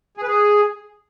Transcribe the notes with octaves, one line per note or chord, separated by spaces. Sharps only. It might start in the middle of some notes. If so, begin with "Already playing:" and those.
G#4
B4
G#4